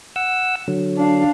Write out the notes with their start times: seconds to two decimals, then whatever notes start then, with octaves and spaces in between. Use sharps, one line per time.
0.16 F#5 E6
0.68 D3 F#3
0.97 D4 F5